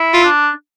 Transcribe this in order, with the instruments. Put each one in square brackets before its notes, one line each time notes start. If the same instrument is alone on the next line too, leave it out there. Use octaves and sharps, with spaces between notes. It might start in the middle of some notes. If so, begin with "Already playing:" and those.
Already playing: [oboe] E4
[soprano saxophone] F4
[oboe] D4